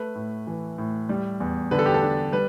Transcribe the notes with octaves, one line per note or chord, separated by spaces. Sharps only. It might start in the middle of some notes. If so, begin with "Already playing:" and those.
Already playing: A3 B4
A2
E3
A2
G3
E2
D3 B4
A4
G4
A4
D4
G3 B4